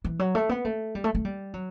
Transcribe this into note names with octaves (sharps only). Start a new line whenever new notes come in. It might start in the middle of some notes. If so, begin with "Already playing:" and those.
E3
F#3
A3
B3
A3
G3
A3
A3
G3
F#3